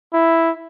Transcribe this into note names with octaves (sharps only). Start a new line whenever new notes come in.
E4